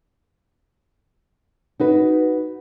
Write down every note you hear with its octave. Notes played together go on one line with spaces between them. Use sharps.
D#4 F#4 B4